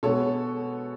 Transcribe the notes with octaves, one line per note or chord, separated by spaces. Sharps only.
B2 G#3 B3 A4 C#5